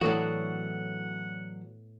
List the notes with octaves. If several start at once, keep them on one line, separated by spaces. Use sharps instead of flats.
A2 E3 F#3 B3 D4 F#4 A4 F#5